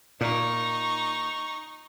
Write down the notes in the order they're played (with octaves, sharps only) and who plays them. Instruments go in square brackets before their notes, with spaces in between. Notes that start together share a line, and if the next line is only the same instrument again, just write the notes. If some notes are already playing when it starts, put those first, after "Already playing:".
[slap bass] A#2 [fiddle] D#4 C#6